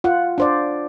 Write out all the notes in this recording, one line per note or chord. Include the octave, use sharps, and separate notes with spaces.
F4 F#5
D4 C5 D5